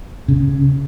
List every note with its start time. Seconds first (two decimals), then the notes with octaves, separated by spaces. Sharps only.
0.28 C#3